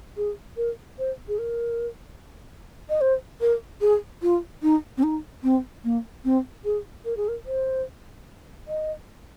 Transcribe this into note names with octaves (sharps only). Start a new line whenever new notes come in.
G#4
A#4
C5
G#4
A#4
D#5
C5
A#4
G#4
F4
D#4
C4
D#4
C4
A#3
C4
G#4
A#4
G#4
A#4
C5
D#5